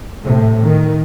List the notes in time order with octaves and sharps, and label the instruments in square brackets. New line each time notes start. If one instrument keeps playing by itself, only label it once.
[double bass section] A2 C3
D#3